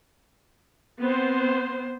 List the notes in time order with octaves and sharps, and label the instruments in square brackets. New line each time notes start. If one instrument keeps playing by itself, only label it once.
[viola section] B3 C4 C5